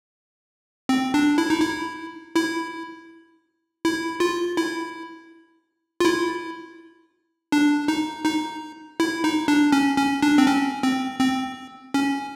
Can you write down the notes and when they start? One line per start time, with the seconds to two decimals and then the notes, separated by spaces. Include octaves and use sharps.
0.89 C4
1.14 D4
1.38 E4
1.50 D#4
1.61 E4
2.36 E4
3.84 E4
4.20 F4
4.57 E4
6.00 F4
6.05 E4
7.52 D4
7.88 D#4
8.26 D#4
9.00 E4
9.24 D#4
9.48 D4
9.72 C#4
9.97 C#4
10.23 D4
10.38 C4
10.47 C#4
10.83 C4
11.21 C4
11.94 C#4